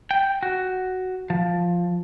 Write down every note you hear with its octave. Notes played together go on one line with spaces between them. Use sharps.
G5
F#4
F3